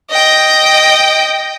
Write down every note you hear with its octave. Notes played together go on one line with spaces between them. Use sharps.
D#5 G5